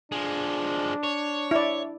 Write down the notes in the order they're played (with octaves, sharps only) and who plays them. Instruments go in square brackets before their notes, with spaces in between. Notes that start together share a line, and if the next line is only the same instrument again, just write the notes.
[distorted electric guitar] F3 G#3 [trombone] D4
[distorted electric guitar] C#5
[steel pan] E4 D5